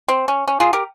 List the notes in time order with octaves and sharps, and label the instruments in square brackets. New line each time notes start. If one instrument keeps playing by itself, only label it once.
[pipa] C4
C#4
C#4
F4 G#4
G4 A#4